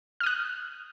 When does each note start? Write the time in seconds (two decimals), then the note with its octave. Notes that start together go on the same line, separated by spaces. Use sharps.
0.20 F6
0.23 D#6
0.26 F#6